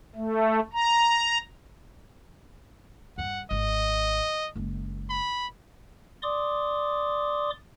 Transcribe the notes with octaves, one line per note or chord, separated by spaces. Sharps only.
A3
A#5
E2 G2 F#5
G#1 D#5
F#1 G#3
B5
D5 C6 D6 D#6